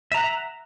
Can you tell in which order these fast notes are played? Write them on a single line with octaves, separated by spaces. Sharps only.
E5 A#5 F#5